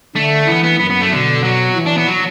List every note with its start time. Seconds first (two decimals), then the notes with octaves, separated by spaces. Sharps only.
0.15 D3 A3
0.47 E3 B3
0.64 B3
0.79 F#2 B3
0.90 B3
1.01 A3
1.12 B2 D3
1.44 F#3
1.75 E3
1.86 D4
1.97 B3
2.07 F#3